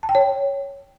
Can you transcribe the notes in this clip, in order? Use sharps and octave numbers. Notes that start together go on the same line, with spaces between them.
A5
G5
C#5